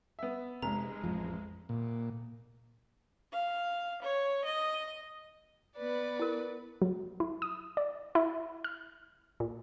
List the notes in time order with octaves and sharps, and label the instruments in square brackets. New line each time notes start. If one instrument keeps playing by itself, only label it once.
[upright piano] B3 E5
[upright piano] F1 [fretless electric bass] C3 [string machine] G#3 [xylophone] A#5
[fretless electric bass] A1 F2 F3
[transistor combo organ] A#2
[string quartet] F5
C#5
D#5
B3 B4 D5
[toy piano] E4 A#4
[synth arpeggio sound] F#3
E4
D#6
D5
E4
F6
A#2